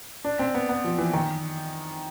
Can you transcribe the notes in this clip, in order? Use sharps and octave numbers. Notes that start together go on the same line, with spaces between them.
D4
C4
B3
B3
F3
E3
D#3